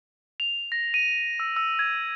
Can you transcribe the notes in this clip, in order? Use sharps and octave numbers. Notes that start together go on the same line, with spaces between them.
F7
A#6
D#7
E6
E6
G#6